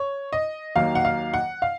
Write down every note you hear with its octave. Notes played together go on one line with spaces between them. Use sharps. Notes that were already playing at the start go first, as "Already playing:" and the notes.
Already playing: C#5
D#5
D#2 D#3 F#3 A#3 F5
F#5
F5
F#5
F5